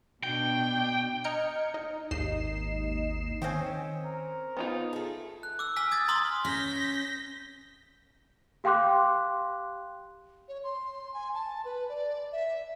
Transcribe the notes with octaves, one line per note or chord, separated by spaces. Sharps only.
B2 D4 G5
D#5 A#5 F6 G6 G#6 C#7
D#4
G#1 D#2 D#4 D#5 C7 E7
D#3 C4 C#4 D#5 G5 G#5
A#4
B3 D#4 F4
A3 G#4
F#6
D6 E6
G#5 E6 F6 B6
D#6 G#6 A6 B6
A#5 C6 D#6 F6 F#7 G7
C#4 G6 A#6 B6
G4 F5 G5 C6 D6 F#6
C#5
C6
G#5
A5
B4
D5
E5